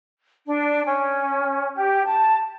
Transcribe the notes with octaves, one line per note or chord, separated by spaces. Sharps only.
D4
C#4
G4
A5